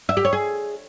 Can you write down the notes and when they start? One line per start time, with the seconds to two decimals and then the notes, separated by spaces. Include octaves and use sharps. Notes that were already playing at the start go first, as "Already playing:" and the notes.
0.09 E5
0.17 G4
0.25 C#5
0.33 G#4